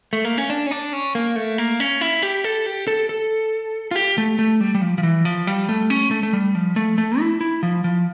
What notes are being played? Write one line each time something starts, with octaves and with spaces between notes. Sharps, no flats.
A3
A#3
C#4
D4
C#4
D4
C#4
A#3
A3
A#3
C#4
E4
G4
A4
G4
A4
A4
F4
G4
A3
A3
G3
G3
F3
F3
E3
F3
G3
A3
C#4
A3
A3
G3
F3
A3
A3
E4
E4
F3
F3